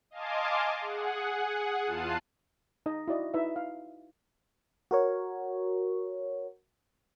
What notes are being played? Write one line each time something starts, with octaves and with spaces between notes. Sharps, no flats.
D#5 F5 G#5 A5 C6 D6
G#4 F#5
E2 F4 A5 F#6 C7 D#7
D#4 D#5
E4 F#4 D5 D#5
D#4 E4 B4 E5
F5
F#4 A#4 C#5